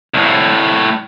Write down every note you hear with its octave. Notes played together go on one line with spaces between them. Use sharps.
C2 A2